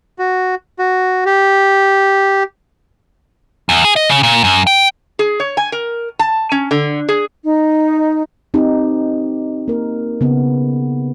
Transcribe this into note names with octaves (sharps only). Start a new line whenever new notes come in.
F#4
F#4
G4
E2
G#4
D#5
C#3
A#2
F#2
G5
G#4
C#5
G#5
A#4
A5
C#4
D3
G#4
D#4
C4 D#4 G4
A#3 A#4
C#3 B3